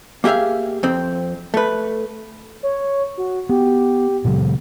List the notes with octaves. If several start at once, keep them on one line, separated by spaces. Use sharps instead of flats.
A#3 G4 G#4 E5 F5
F2 C4
A3 B4
C#5
F#4
B3 G4
A#2 C#3 F#3